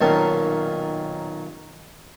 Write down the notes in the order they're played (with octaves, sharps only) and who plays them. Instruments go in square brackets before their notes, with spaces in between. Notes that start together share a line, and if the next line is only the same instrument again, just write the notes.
[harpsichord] B1 A#2 D#3 A#3 C#4 A5